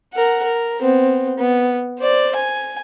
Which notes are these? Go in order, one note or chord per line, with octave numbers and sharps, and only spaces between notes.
A#4 F#5
A#4
B3 C4
B3
C5 D5
G#5